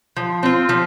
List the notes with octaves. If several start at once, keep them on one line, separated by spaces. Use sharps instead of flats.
F3
C4 F4
F3